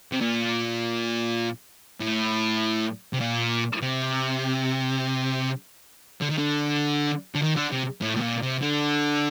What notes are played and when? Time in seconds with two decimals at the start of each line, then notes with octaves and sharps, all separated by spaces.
0.12 C3
0.21 A#2
2.01 A2
3.13 C3
3.20 A#2
3.82 C3
6.21 D3
6.30 D#3
6.38 D3
7.35 D3
7.42 D#3
7.56 D3
7.72 C3
8.02 A2
8.17 A2
8.21 A#2
8.42 C3
8.61 D3